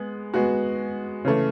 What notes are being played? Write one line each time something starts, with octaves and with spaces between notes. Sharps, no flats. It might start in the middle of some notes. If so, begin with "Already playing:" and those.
Already playing: G#3 B3
G#3 B3 F#4
C#3 E3 A3